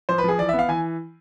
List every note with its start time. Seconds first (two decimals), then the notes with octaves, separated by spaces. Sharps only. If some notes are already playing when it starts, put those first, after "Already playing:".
0.09 F3 C5
0.18 B4
0.24 F3 G#4
0.39 E3 D5
0.49 E5
0.53 B3
0.59 F5
0.69 E3 G#5